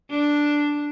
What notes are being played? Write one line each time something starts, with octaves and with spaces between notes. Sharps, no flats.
D4